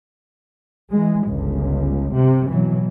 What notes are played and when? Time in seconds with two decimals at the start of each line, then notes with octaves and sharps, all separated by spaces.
0.91 E3 G#3
1.28 G1 C#2
2.15 C3
2.50 B2 E3 F#3